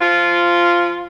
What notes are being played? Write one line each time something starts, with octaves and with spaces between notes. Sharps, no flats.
F3 F4